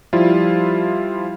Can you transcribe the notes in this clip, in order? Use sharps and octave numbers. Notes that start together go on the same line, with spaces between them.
F3 G3 E4 F4